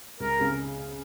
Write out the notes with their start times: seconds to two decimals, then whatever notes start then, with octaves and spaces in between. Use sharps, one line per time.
0.20 C#2 A#4
0.39 C#3 G#3